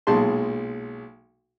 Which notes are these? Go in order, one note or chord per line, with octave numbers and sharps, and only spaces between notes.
B1 A#2 G#3 A5 C6